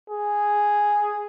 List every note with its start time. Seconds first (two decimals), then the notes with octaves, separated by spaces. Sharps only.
0.10 G#4